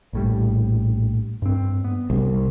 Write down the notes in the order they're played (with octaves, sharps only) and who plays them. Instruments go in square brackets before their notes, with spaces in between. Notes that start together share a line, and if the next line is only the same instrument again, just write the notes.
[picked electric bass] A#1 A2 G3
G2 C4
B3
[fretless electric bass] C2